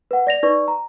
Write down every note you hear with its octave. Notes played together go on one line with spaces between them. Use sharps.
B4 F#5
D5 A#6 F7
D#4 B4 D5 C#6
A#5